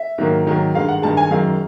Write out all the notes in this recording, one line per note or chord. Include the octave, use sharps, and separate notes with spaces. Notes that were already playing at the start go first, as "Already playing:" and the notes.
Already playing: E5
G#2 D#3 F#3 A#3
G#2 D#3 F#3 A#3
G2 D#3 G#3 F5
F#5
G2 D#3 G#3 A5
G#5
F#2 D#3 G#3 F5